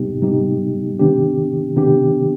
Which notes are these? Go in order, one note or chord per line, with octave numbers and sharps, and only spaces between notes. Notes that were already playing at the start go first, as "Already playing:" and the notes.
Already playing: C3 G3 B3 D#4 G4
C3 G3 B3 D#4 G4
C3 D#3 B3 D4 G4
C3 D#3 B3 D4 G4